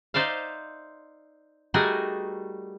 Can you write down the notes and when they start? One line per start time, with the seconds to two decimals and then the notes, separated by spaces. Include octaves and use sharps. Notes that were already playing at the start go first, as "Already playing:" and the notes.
0.14 D#4 C5 D5 E5 F5
1.74 G3 A3 D#4 F#4 G#4 A#4